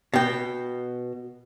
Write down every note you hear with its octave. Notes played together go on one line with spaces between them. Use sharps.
B2 G5